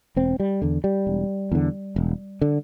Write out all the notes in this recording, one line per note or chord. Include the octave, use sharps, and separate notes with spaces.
E1 C4
G3
E2 D3
G3
E1
E2 D3
E1
D3